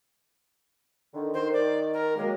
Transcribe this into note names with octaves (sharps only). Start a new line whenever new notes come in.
D3 D#3
D#3 C5
D5
A#4
F#3 G#3 A#3 G4